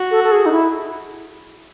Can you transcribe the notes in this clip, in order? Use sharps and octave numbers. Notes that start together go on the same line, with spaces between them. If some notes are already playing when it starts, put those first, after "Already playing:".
Already playing: F#4
A4
A4
G#4
D#4
E4